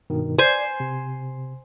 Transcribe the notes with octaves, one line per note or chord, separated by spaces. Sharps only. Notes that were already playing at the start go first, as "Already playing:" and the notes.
G2 B2 D#3
C5 D5 G#5
C3